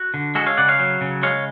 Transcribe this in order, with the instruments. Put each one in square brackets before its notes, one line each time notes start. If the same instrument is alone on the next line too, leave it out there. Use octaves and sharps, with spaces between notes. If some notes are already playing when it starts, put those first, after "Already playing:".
Already playing: [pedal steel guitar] F#4
D3
G#3 F#4 A4
C#5 F5
C#3 D5 F#5
C#5 F5
F#3
C#3
G#3 C#5 F5